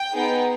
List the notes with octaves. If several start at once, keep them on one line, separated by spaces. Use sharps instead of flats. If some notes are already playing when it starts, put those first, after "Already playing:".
Already playing: G5
B3 D#4 G#4